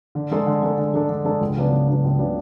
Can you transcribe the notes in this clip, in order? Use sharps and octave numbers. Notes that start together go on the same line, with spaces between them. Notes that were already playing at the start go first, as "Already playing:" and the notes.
D3
G#3 D4 A4
D3
G#3 D4 A4
D3
G#3 D4 A4
D3
G#3 D4 A4
C#2
C#3 F#3 B3 D4
C#2
C#3 F#3 B3 D4
C#2
C#3 F#3 B3 D4